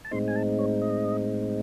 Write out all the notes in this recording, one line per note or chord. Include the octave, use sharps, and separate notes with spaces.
A5
A2 G#3 C4 D#4 C6
G#5
A5
C#5
D#5